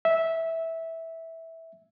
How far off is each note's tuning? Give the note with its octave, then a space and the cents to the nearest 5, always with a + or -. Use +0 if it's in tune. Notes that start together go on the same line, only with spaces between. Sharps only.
E5 -10